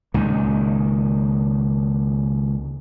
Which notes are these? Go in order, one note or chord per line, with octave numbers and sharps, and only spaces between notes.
C#2 A#2 D#3